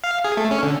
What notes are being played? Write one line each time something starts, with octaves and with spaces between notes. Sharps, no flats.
F5
G#4
A3
C#4
D3